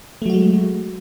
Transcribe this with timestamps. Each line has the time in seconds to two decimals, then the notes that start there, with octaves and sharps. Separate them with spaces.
0.22 A3
0.26 F#3
0.30 F#4
0.34 G#3